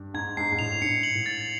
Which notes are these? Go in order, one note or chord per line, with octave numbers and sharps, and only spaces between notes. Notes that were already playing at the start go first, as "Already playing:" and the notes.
Already playing: G2
G#2 G#6
G#2 C7
G#2
A2 F7
G#2 C#7
F#7
A2
A6